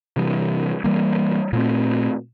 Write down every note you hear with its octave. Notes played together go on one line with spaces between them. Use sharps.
C3 E3 G3
E3 G3 A#3
A#2 A3 C4